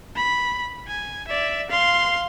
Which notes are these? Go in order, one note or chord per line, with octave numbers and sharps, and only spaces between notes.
B5
G#5
D5 E5
F5 C6